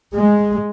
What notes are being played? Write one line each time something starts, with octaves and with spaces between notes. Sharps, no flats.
G#3